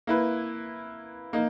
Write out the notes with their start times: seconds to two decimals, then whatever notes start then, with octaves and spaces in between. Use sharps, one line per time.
0.07 A#3 E4 B4
1.33 A#3 D#4